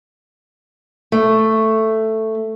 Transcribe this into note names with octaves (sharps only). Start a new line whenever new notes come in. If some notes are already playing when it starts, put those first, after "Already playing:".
A3